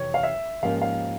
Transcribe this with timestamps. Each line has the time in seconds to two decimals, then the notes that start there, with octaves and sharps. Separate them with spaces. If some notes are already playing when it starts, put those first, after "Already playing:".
Already playing: F2 C3 E3 C#5
0.14 F5
0.23 E5
0.63 G#2 F3 A#3 C#4 G4 F5
0.82 F5